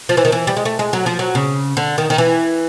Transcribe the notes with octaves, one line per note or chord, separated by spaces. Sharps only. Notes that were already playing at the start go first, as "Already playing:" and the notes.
F3
E3
D#3
E3
G3
G#3
A3
G#3
F#3
F3
F#3
C#3
D3
D#3
D#3
E3